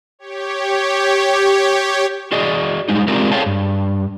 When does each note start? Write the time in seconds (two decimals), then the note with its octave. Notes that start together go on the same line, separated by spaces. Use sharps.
0.19 G4 C#5
2.32 F#4 G#4 D5 D#5
2.88 G3 G#3 D#4
3.08 G#3 C4 F4 G4 A#4 D5
3.32 G#4 A4 C#5 F5 G5 A5
3.46 G2